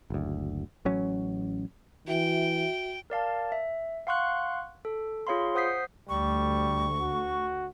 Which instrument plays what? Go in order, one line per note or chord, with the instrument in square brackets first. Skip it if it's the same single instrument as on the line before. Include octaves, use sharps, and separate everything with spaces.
[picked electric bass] F#1 D2
A1 F#3 C#4
[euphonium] E3 [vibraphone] F#4 E5 [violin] G5
[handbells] A#4 D5 F5 A5
E5
F5 F#5 C6 C#6 F#6
A4
F4 G#4 C#5 F5 B5 C6
C5 F#5 D#6 G6 B6 C7
[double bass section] D2 [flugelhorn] G3 [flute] C#6
[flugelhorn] F#4